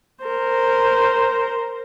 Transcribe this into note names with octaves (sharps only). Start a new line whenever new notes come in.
A#4 C5